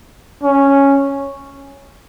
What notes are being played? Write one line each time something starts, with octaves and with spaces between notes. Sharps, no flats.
C#4